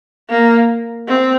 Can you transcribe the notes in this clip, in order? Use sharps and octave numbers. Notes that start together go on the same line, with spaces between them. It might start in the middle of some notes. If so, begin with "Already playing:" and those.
A#3
C4